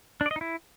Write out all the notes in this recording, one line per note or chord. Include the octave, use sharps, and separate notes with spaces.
D4
D5
D#5
D#4
E4